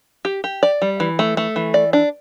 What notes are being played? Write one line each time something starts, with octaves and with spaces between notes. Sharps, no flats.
G4
G4
D5
G3
E3
A3
A3
E3
D5
D4